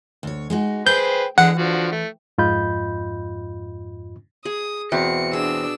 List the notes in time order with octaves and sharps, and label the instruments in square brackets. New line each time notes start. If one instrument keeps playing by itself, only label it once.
[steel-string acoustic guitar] D2 C#5
G#3 D#4 F#4
[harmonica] G#4 B4 C5 [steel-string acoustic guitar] G5 [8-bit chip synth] G6
[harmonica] D3 G#3 [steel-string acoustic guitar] E3 [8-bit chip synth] F#5
[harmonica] D3 F3 F#4
A3
[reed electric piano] F2 G#2 F4 D#5 B5 G6
[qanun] G#4 [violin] D#6
[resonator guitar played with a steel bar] E2 C4 [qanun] B2 [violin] C#7
[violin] D4 E6 [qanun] G#4